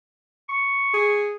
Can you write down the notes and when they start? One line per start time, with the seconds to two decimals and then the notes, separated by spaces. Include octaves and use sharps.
0.49 C#6
0.94 G#4